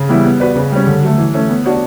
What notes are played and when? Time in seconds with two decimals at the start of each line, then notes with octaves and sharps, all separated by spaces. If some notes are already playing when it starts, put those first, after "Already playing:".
Already playing: C#3
0.09 E3 G3 B3 E4
0.24 B3
0.40 F#4 B4 D5
0.56 C#3
0.72 G3 C#4
0.87 D3
1.02 F#3 A3
1.18 E3
1.34 A3 C#4
1.49 B3
1.65 D4 F#4 C#5